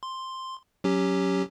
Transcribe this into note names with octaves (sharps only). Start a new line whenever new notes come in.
C6
F#3 C#4 G4